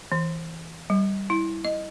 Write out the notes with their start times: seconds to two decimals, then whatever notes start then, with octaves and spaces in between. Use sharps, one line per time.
0.12 E3
0.90 G3
1.30 E4
1.65 D#5